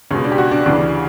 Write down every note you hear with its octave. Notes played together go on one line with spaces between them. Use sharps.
C#2 B2 C#4
D4
G4
F#4
D4
D2 C#3 E3 D4